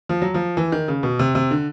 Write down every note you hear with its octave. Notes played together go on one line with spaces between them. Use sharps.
F3
F#3
F3
E3
D#3
C#3
B2
C3
C3
D3